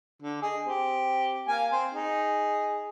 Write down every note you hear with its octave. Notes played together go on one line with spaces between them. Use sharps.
D3
G#4 D#5
C4 G4
A#3 F5 G#5
C4 C5
D#4 G#4